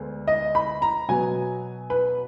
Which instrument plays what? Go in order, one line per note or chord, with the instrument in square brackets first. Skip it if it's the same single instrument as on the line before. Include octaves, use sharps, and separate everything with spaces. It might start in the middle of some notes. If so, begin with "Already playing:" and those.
Already playing: [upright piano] D2 D3 G#3 B3
D#5
B5
A#5
B2 F#3 B3 G#5
B4